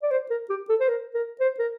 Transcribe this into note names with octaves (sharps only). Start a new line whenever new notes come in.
D5
C5
A#4
G4
A4
C5
A#4
A#4
C5
A#4